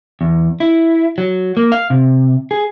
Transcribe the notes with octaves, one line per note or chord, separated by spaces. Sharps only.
E2
E4
F#3
A#3
F5
C3
G#4